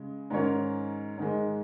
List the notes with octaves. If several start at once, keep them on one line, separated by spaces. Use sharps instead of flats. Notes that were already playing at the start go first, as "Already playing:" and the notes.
Already playing: C#3 G#3
G#2 D#3 C#4 A#4 C#5
G#2 D#3 G#3